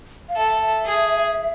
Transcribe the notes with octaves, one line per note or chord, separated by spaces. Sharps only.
F5
A4 E5
G#4